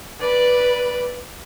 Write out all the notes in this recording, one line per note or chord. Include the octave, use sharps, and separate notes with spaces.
B4 D5